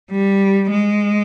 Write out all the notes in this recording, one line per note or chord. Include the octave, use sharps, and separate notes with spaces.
G3
G#3